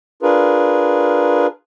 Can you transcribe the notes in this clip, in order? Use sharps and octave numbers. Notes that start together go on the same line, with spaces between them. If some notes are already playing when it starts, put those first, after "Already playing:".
D4 F4 G#4 A#4 B4